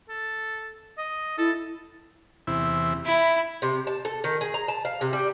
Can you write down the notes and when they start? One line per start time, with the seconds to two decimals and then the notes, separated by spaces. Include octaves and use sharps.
0.09 A4
0.98 D#5
1.38 E4 A4
2.47 E2 C3 E4
3.06 E4 B5
3.62 C3
3.87 A5
4.05 A4
4.24 D#3
4.41 G#4
4.54 A#5
4.68 A5
4.85 F5
5.01 C3
5.13 G3